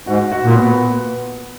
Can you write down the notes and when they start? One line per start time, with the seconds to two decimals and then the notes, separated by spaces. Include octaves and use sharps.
0.07 G#2 F#4
0.32 F#4
0.44 A#2
0.56 B3